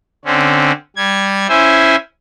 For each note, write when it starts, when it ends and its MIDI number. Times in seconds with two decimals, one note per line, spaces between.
0.25 0.72 50
0.25 0.72 60
0.25 0.72 61
0.96 1.47 55
0.96 1.47 92
1.49 1.96 61
1.49 1.96 64
1.49 1.96 72
1.49 1.96 76
1.49 1.96 80